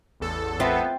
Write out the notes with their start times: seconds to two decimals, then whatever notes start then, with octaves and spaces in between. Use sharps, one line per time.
0.20 A1 E2 A4
0.60 B3 C4 F4 E5